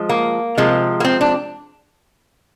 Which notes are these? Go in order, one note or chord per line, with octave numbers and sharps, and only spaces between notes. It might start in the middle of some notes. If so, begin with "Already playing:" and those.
Already playing: F3 G#3
A#3
C3 F3 G#3
A#3
C4
D4